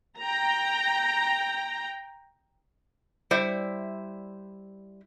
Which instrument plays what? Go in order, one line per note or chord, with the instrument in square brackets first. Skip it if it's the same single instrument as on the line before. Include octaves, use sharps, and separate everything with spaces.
[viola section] G5 A#5
[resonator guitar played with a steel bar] G3 E4 C5 E5